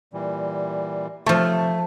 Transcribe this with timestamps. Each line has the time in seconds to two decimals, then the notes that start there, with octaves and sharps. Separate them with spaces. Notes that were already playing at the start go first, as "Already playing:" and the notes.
0.13 A#2 E3 G3
1.26 C3 F3 A3 C#5